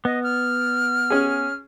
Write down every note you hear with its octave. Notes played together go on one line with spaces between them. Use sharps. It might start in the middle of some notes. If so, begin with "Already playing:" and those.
B3 D#5
F6
C#4 G#4